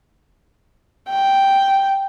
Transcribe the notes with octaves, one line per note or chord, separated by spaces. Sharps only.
G5